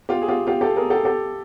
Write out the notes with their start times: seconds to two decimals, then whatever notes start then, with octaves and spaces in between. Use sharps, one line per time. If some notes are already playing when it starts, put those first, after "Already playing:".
0.09 F4 G4
0.22 G#4
0.28 F4 G4
0.47 F4 G4
0.61 G4 A4
0.76 G#4 A#4
0.90 G4 A4
1.05 G4 A4